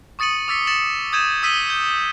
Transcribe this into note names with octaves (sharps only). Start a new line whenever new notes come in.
C#6 D#6 A6 C#7 D#7 F#7
D6 E6 A6 B6 C#7
A6 C#7 E7 F#7
D#6 G6 G#6 D#7 E7
D#6 E6 B6 D#7 F#7 G7
G6